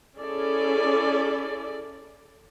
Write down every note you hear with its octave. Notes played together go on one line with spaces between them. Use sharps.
C#4 E4 G#4 A4 D5